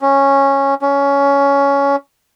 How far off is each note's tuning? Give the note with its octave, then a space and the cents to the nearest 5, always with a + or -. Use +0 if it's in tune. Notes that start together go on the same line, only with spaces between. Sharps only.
C#4 -10
C#4 +15